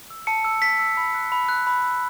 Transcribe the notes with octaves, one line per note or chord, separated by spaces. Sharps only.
E6
A5 C#7
E6
A5 B6
E6
B5
F#6
B5
F#6
B5
E6